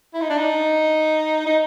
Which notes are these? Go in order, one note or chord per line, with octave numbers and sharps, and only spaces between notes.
E4
D#4
D4
D#4
D#4